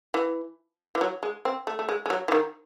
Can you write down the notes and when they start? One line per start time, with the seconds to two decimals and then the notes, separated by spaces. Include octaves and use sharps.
0.14 E3
0.95 E3
1.01 F#3
1.23 G#3
1.45 C4
1.67 A3
1.79 A3
1.89 G#3
2.06 G#3
2.10 F#3
2.28 E3
2.32 D#3